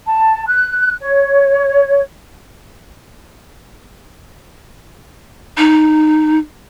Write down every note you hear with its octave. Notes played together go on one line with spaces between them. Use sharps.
A5
F#6
C#5
D#4